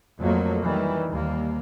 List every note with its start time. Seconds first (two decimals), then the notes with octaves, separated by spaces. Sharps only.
0.19 F2 F#3 A3 A#3
0.63 D#3 E3 G3
1.08 D#2 G3 A#3